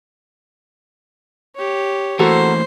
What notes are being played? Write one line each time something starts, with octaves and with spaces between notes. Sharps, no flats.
G4 C#5
E3 A3 A#3 F#4 A4 A#4 C5